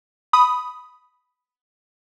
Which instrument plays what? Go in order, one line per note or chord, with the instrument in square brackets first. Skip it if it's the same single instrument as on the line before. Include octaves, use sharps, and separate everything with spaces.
[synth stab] B5 D#6